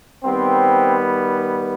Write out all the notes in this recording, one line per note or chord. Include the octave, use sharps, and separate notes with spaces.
D#3 G3 B3 C4